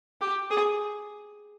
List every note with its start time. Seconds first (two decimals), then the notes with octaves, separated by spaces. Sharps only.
0.21 G4
0.50 G#4